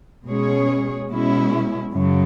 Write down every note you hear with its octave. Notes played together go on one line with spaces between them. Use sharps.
B2 G#3 C#4 G#4 C#5
B2 G#3 C#4 E4
F#2 C#3 F#3